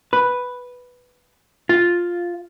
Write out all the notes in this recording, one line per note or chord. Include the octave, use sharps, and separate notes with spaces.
B4
F4